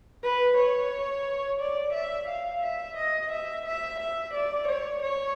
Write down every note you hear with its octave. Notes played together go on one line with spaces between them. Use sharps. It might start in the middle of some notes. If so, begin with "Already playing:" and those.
B4
C#5
D5
E5
F5
E5
D#5
E5
E5
E5
D5
C#5
C#5